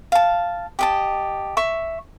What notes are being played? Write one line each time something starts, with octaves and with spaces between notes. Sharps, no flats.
F5 A5
G4 D#5 A5
E5 C#6